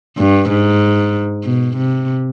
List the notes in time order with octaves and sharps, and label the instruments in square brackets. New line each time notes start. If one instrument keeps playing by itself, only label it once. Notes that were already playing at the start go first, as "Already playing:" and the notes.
[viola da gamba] G2
G#2
B2
C3